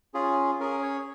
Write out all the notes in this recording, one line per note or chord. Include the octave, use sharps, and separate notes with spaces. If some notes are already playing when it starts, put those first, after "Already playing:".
C#4 F4 G#4
C#4 G#4 A#4
C#5